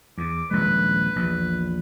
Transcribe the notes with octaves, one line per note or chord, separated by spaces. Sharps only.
E2 D6
D#1 A#1 G#3 B4
A#1 E2